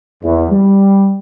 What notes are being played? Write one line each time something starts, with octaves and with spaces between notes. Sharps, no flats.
E2
G3